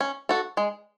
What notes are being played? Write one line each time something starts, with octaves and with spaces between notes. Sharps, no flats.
C#4
F#4 A4
G#3